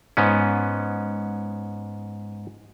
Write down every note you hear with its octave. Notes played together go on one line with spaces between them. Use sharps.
G#2 B3 C#4